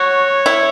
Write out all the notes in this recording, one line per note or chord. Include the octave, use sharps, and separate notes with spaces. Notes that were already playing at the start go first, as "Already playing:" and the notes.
Already playing: F#4 C#5
E4